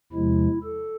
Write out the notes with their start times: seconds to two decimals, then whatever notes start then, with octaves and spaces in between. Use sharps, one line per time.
0.12 E2 C3 F3 G#3 E4
0.63 A4